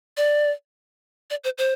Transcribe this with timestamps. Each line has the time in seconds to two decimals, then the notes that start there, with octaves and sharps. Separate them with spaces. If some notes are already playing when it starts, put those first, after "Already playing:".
0.17 D5
1.30 D5
1.44 C5
1.58 C5